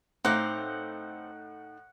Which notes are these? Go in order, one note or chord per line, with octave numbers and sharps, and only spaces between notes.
A2 C4 D#4 F5 F#5 D6